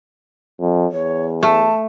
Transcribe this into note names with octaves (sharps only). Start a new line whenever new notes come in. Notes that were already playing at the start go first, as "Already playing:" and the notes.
F2
E2 C#5
A3 A5